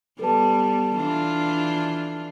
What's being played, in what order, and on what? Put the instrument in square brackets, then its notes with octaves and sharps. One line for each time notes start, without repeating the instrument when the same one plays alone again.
[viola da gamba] G3 B3 [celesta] A4 B4 A5
[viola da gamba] E3 D4 F4